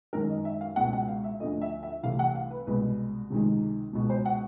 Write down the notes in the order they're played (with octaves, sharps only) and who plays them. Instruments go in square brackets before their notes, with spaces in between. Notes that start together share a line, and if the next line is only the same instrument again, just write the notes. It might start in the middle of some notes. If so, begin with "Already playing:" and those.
[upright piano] F#2 D#3 G#3 A#4
D#5
E5
F5
C#2 B2 G#3 F#5
F#5
F5
E5
D2 D3 F3 A3 D#5
E5
E5
C2 C3 E3 A3 F5
F#5
F5
B4
C2 B2 G#3 B4
C#2 C3 D#3 G#3
C#2 B2 G#3
C5
F#5